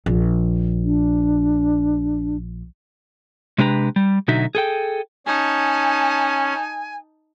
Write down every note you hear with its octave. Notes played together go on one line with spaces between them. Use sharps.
A#1
D4
C3 G#3 D4 G4 B4 A#5
G3
B2 D3 F#3 D#4 E5
G#4 A4 G5
C#4 D#4 G#5 A5